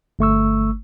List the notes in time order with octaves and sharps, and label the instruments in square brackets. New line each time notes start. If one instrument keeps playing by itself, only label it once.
[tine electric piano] G1 A3 C#6 E6